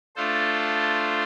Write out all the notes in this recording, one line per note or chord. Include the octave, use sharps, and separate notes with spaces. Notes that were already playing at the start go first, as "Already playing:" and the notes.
A3 D4 F4 A4 C5